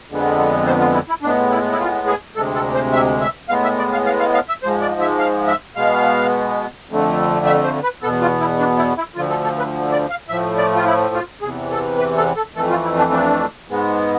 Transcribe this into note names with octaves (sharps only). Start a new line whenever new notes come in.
F2 D3 G#3 B3
C5
F4
E4
E4
A2 G#3 B3 D4
E4
E4
F4
G#4
D2 C3 G#3 A4
A4
C5
E5
E5
A2 G#3 B3 F5
E5
D5
F5
F5
F5
F5
E5
G#2 F3 G#3 C5
D5
E5
F5
E5
B2 G#3 B3 F5
F2 D3 A3
E5
C5
B4
E2 B2 B3 A4
F4
E4
D4
E4
E4
D2 D3 F3 F4
A4
A4
B4
D5
F5
A2 F3 A3 E5
D5
F4
E4
F4
E2 C3 E3 G#4
A4
B4
A4
A4
F2 E3 A3 A4
F4
E4
D4
D4
G#2 G#3 B3